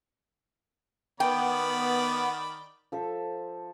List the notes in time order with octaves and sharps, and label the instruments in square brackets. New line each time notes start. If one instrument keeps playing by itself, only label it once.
[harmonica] D#3 D5 B5 [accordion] B3 [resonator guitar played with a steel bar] G5
[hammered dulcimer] F3 A4 C5 E5